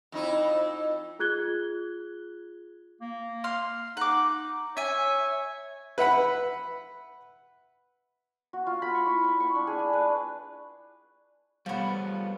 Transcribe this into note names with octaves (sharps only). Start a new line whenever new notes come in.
F2 D#4 E4
F4 G#4 F#6 G#6 G7
A#3
F5 C6
D#4 F#5 D6
C#5 E5 G#5
B4 E5 F#5 B5
F#4
F4
B5
C#6
E4
B5
C#6
D4
G#4
D4
B4
F3 G3 A3 B3 C#5